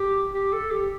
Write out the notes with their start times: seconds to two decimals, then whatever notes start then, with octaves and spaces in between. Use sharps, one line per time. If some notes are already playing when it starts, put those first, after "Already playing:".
Already playing: G4
0.33 G4
0.53 A4
0.71 G4